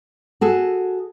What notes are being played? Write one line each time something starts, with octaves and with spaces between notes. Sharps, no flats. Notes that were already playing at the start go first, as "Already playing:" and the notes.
F#4 G#4 A4